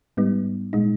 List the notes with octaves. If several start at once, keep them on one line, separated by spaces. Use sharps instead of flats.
G#2 G3 B3 D#4
A#2 G#3 D#4